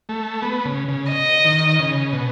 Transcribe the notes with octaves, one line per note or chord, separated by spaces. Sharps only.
A3
B3
C#3
C#3
D#5
D#3
C#3
B2